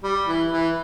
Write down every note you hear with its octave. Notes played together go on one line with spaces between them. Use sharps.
G3
E3
E3